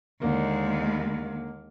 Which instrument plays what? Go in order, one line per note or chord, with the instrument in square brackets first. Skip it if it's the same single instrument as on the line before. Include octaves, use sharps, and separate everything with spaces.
[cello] D#2 G#3 [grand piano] D3 A#3